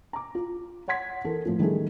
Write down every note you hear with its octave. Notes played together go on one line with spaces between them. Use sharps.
A#5 D6
F4
C#5 F#5 C6 G#6 B6
E3 A4 A#4
A2 F3
D#3 E3 G3 A3 C#4 G#4